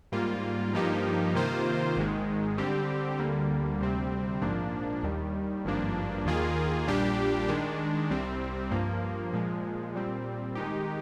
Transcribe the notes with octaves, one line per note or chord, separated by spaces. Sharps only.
G#2 G3 A#3 F4
G2 F3 A#3 D#4 G4
C3 D#3 A#3 F4 C5
G#1 G#2 D#3 G#3
D3 G3 C4 G4
D2 D3 G3 A#3
D2 C3 G3 C4
A#1 G#2 F3 A#3 D4
D#2 D#3 G3
G#1 G2 F3 A#3 D4
D#2 D#3 A#3 F4 G#4
A#1 A#2 G3 D4 G4
D#3 G#3 D4
C2 C3 G3 C4
G2 F3 A#3
A#2 F3 G#3
A#2 G3 C4
D#3 G#3 D#4 G4